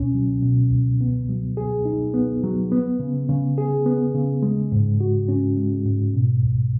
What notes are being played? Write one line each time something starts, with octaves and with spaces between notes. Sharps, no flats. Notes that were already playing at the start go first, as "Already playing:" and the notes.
Already playing: C#2 B2 C#4
F#3
B2
C#2
B3
F#3
G#4
D#4
B3
F#3
B3
C#3
C#3
G#4
B3
C#3
G#3
G#2
F#4
C#4
G#3
G#2
B2
C#2